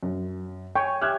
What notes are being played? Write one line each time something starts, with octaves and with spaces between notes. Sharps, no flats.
F#2
C#5 G5 G#5 C#6
G4 E5 F6 F#6 G#6